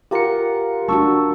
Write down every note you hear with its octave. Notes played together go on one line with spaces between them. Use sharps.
F4 G4 A#4 F#5 C#7
A3 D4 F#4 A5 C#6 E6